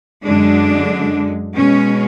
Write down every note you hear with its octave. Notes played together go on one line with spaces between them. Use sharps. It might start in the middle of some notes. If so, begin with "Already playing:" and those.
F#2 D3 G#3 D4
B2 G#3 C#4